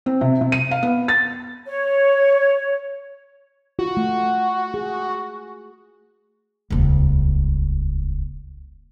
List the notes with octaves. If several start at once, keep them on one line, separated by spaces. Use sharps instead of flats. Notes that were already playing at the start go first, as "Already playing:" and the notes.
C4
C3
C3
D#7
F5
B3
A6
C#5
F4 F#4
A3
G#4
D#1 C#2